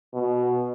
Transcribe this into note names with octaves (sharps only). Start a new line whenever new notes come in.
B2